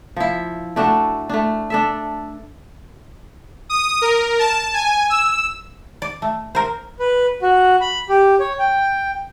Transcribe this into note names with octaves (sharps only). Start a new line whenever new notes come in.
F3 E4
A3 D4 F#4 A4
A3 D4
D4 A4 E5
D#6
A#4
A5
G#5
E6
D5
A3
A#4 C5
B4
F#4
B5
G4
C#5
G5